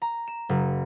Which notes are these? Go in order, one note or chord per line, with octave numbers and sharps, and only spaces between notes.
A#5
E7
F#1